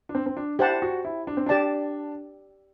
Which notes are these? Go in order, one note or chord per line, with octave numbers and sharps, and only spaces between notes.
D4
C4
C4
D4
E4 G4 C5 F#5 A5
F#4
E4
D4
C4
D4 G4 D5 A5